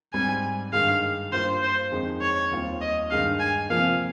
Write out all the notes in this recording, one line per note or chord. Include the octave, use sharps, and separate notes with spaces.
G#2 G3 C4 G#5
G2 D#3 G#3 F5
G2 G3 A#3 F4 C5
C5
F2 D#3 G#3 D#4
C#5
D#2 D#3 G3 C4 F4
D#5
G2 D#3 G#3 D#4 F5
G#5
C3 F3 A#3 F5